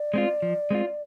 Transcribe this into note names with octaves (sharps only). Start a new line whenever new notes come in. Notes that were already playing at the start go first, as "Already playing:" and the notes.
Already playing: D5
G#3 C4 F4
F3
G#3 C4 F4